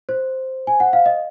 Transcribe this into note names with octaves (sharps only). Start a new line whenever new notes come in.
C5
G#5
F#5
F5
D#5